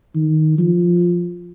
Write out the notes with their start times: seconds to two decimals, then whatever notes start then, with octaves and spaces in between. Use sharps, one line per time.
0.15 D#3
0.58 F3